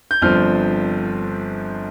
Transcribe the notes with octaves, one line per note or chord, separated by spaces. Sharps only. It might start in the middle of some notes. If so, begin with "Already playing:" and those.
G6
G1 G2 F3 C4 F6